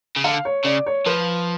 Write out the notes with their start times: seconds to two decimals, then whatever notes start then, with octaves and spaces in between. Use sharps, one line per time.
0.16 C#3
0.24 D3 F5
0.45 C#5
0.65 C#3 D5
0.86 C#5
1.06 F3 B4